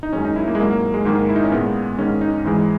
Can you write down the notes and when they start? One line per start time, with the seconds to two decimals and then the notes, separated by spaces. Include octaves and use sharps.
0.03 D#4
0.13 F#2 D#3 G#3 C#4
0.25 D#4
0.36 E4
0.48 A#3
0.55 G#3
0.59 G#2 A#3
0.63 F#3
0.70 A#3
0.94 G#3
1.05 G#2 D#3 G#3 A#3
1.29 E4
1.36 D#4
1.44 C#4
1.52 A#2 G#3 B3
1.98 G#2 D#3 G#3 C#4
2.21 D#4
2.44 G#2 E3 G#3